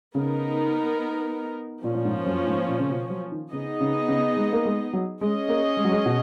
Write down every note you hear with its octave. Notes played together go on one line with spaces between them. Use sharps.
C#3 B3 D#4 A#4
A#2 F3 A#3 C#4
A#2
G#2
F#2
G#2
A#2
C#3
B2
F#3
D#3
C#3 B3 D#4 G#4 D#5
C#3
C#3
G#3
A#3
G#3
F#3
G#3 C#4 G#4 D#5
A#3
G#3
F#3
G#3
B2